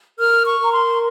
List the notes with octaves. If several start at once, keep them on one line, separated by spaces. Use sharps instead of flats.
A#4 F6
C#6
A#4 A#5
C6